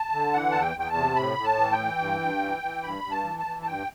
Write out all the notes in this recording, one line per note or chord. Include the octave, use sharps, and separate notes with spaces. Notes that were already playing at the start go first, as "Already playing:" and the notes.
Already playing: A5
D3
E3 F#5
E2 A5
G5
E2 G5
A5
C3
A2 B5
A2
A5
E3
G5
E3
G2
G2
E3
E3
G2 B5
G2
A5
E3
A5
E3
A5
G2 G5